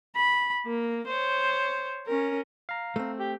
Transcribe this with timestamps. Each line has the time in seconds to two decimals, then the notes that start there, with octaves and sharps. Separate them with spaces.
0.16 B5
0.66 A#3
1.07 C5 C#5
2.07 C#4 A#4
2.69 F5 A#5
2.96 A3 C4
3.19 G4